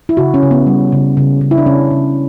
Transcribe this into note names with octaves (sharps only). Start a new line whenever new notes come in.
E4
C#3 F#4
C#4
C#3
B3
G3
C#3
C#3
C#3
E4
D4
C#3 C#4
C#3